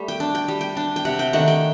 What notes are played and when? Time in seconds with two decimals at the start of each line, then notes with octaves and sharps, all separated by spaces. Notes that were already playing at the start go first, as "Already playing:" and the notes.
Already playing: G3 A3
0.08 G5
0.20 D4
0.35 G5
0.48 G3
0.61 G5
0.77 D4
0.96 G5
1.05 C3 F#5
1.19 G5
1.33 D#3 A3 D4 F#5
1.48 G5